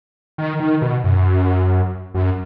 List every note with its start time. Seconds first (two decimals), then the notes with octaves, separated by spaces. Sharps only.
0.38 D#3
0.60 D#3
0.82 B2
1.04 F#2
2.14 F#2